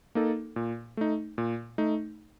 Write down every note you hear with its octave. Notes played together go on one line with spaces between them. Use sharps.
A#3 D#4 A4
A#2
A3 D#4
A#2
A3 D#4